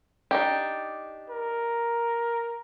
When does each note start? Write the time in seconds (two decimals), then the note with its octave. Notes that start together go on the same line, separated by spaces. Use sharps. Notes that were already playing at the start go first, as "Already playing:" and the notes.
0.31 D4 D#4 G4
1.30 A#4